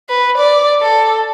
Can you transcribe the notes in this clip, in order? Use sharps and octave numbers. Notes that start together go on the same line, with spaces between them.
B4
D5
A4